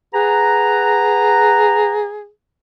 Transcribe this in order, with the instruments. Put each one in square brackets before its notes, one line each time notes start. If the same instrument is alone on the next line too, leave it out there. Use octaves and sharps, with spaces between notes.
[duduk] G#4 [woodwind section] B4 F#5 A#5